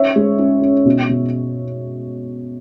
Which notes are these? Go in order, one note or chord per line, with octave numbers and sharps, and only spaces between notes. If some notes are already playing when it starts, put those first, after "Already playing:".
Already playing: C#4 C#5 E5
G#3
C#4
C#4
B2
B2